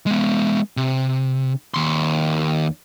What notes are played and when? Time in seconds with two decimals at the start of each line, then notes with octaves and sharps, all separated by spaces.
0.06 G#3 B3
0.77 C3
1.74 D#2 C6